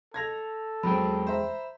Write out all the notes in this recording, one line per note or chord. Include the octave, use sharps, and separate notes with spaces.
A4 G#6 A#6 F7
E2 F#3 G#3 C4 G5 B5
C5 E5 A#5